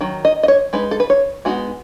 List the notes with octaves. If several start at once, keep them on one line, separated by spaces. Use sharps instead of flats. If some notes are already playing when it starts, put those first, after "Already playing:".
D#3 F#3
D#5
D#5
C#5
G#3 D#4 B4
A4
B4
C#5
G#3 B3 D#4 F#4